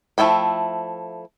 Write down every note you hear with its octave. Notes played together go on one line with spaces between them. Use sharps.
F3 A3 E4 G5 B5